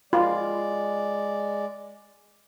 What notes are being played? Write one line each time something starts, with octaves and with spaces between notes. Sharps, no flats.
G#3 F4 D5